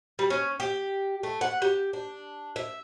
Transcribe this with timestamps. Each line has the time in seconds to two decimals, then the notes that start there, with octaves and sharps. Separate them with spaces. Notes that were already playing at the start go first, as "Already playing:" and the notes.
0.19 G3
0.30 C#4
0.60 G4
1.23 A3
1.41 F#5
1.62 G4
1.93 D4
2.56 E5